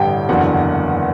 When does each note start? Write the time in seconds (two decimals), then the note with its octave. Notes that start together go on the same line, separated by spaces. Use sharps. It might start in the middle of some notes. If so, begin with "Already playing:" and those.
Already playing: A1 G2 D3 G3 G5
0.29 F#1 E2 D3 F#3 F#5